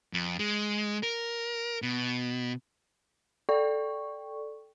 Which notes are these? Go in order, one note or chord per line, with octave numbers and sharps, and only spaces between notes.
F2
G#3
A#4
B2
A4 D5 G5 C#6